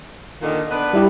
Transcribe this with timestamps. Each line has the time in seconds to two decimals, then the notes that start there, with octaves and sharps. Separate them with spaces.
0.42 A#2 D3 D#3
0.71 B3 D4 B4
0.93 G3 E4 G4